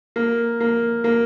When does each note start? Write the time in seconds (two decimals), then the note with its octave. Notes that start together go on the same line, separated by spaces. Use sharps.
0.16 A#3
0.60 A#3
1.04 A#3